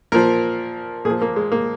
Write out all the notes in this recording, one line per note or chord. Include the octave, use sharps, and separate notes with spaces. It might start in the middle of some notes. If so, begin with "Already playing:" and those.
A#2 F3 A#4
A#2 G#4
F3
A#3
G#3
A#3